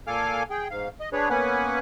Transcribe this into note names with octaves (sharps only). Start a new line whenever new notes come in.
A#2 A4 F5 G#5 D6 F6
G#4 G5
G#2 F5
D#5
D4 G#4 B4 C#5
A#3 B3 C#4 B4 F#5 G#5